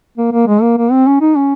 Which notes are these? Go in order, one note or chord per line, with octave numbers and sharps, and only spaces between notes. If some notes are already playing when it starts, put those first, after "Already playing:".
A#3
A#3
G#3
A#3
A#3
C4
C#4
D#4
C#4